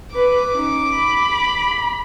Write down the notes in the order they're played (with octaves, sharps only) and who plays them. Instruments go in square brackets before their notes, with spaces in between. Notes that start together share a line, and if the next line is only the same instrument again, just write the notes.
[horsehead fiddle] B4 [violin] D6
[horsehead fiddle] C#4 D#4
B5